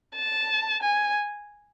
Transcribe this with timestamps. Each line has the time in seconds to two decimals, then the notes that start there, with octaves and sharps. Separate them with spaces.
0.15 A5
0.83 G#5